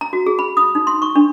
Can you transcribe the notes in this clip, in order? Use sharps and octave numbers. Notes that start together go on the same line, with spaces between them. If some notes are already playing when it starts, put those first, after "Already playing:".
A#5
F#4
G#4
B5
D#6
D#4
C6
C#6
D4